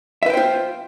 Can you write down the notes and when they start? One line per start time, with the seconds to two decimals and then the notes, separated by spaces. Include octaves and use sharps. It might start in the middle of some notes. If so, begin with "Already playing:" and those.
0.23 E5
0.26 B4
0.30 G5
0.33 C5
0.37 F4